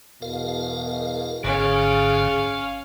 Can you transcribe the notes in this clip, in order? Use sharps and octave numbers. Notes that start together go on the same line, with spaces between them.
E2 B2 A#4 F5
G#1 G#2 D3 C#4 G#4 F5